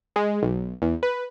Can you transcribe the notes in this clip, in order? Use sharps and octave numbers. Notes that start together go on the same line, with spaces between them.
G#3
B1
E2
B4